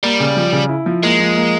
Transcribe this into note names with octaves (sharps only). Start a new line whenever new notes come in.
G3 A#3
C#3
F3
C#3
E4
F3
G#3 A#3
F3
A#3